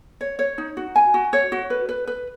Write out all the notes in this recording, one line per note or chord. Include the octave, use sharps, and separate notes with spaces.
C#5
C#5
D#4
F#4
G#5
F#4
C#5
F#4
B4
B4
B4